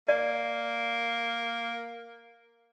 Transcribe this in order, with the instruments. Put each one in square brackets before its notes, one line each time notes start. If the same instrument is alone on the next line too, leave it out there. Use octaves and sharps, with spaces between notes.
[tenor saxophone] A#3 [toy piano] D5